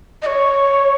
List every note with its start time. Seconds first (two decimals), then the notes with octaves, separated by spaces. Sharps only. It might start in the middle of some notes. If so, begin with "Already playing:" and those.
0.22 D#5
0.26 C#5